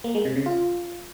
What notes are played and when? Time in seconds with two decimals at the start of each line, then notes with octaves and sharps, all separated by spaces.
0.04 A#3
0.15 G#3
0.25 C3
0.36 C#3
0.46 F4